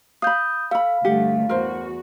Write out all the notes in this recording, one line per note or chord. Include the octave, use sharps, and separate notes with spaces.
F5 B5 D#6 G6
A4 F5 B5
D2 G2 A3 G4 F#5
E2 F#4 A#4 C5